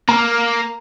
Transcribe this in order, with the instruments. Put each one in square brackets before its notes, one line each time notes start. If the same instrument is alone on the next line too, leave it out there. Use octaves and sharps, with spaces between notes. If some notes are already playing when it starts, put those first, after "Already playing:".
[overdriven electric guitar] A#3 [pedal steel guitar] A#5 F6